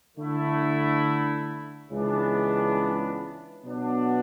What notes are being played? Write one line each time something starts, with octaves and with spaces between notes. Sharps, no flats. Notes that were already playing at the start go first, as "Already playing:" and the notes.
D3 A3 E4
C#2 C#3 E3 B3 D4
B2 F#3 B3 D4